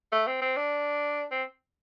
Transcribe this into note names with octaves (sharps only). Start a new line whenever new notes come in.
A3
C4
C4
D4
C4